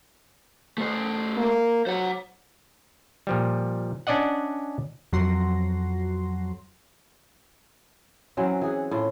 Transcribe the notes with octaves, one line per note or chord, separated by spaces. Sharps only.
A3 C5
A#3
F#3 C5 F#5
A#2 F3 G3
C#4 D4 D5 D#5 F#5
F2 F#3 F#4 C6 A#6
E3 F#3 C4 C#4
E3 G#4 F#5
A2 F4